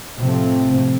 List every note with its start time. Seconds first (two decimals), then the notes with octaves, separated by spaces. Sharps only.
0.20 A2 C3 F3 A3 C4